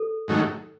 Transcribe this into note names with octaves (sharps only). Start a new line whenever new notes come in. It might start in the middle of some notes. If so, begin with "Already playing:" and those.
Already playing: A4
G#2 D#3 F#3 A3